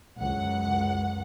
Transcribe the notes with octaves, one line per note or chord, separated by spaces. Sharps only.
C#2 F#2 F#5